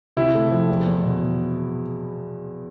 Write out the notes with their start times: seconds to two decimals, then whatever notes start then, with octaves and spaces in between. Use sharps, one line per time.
0.17 C3 E4
0.34 A3
0.51 F3
0.69 E2
0.86 E2
1.03 B2